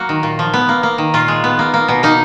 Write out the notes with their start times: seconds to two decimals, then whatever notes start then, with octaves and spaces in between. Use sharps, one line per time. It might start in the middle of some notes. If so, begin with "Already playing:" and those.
Already playing: F#3 A#3 F#4
0.09 D#3
0.23 A#2
0.39 F3
0.54 B3
0.69 A#3
0.83 A#3
0.98 D#3
1.14 A#2 F4
1.28 G#3
1.44 B3
1.59 A#3
1.74 A#3
1.88 B2
2.03 A#3 D#4